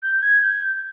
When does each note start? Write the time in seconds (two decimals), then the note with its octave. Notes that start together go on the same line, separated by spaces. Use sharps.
0.03 G6
0.22 G#6
0.42 G6